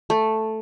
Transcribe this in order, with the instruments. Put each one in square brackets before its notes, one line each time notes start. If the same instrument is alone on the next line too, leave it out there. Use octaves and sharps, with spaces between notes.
[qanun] A3